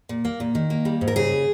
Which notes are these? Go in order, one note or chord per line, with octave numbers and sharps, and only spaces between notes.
A#2
A#3
A#2
D#3
A#3
G3
G#2
A#4
C#3 G#4